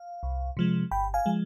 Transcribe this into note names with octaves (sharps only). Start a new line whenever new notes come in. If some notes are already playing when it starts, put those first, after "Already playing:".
Already playing: F5
C2
C3 F3 G#3
G1 G5 B5
F5 G#5
F3 G#3